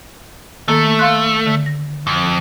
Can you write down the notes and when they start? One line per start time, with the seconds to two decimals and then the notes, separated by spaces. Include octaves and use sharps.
0.68 D#3 A3 A#3 A4
0.99 F5 C6 F#6
1.46 D3
1.66 A#6
2.07 F2